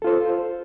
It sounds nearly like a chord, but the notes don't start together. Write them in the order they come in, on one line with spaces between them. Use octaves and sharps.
A4 F4 C5